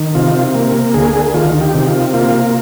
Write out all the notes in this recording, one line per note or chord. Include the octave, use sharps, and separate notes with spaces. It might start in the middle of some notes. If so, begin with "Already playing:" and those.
Already playing: D#3
C3 F4
A#3
D2 G#4
D#3 F4
G4
C3
F4
A#3 F4